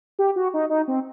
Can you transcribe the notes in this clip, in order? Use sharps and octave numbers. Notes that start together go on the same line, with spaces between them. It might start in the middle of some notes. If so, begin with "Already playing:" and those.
G4
F#4
D#4
D#4
C4